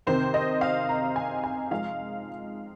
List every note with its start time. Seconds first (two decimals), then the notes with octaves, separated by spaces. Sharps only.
0.07 C3 D#3 C4 C5
0.34 D#5
0.61 F5
0.89 A#5
1.16 G#5
1.44 G#5
1.71 F3 G#3 D#4 F5